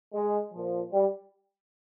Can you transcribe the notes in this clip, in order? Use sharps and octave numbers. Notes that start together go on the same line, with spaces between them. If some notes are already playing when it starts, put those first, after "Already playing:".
G#3
A#2 F3
G3